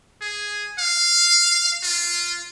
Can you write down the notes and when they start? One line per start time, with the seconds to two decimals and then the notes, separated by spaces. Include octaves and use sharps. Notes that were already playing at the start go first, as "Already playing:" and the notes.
0.21 G#4
0.79 F5
1.83 F4